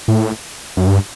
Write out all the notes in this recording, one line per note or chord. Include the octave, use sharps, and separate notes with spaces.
A2
F#2
G2